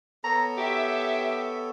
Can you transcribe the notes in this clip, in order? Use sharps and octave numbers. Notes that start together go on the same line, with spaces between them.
B3 A4 C#5 A#5
G4 E5